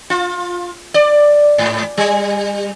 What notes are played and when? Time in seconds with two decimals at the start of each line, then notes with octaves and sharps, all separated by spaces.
0.10 F4
0.94 D5
1.58 G#2
1.97 G3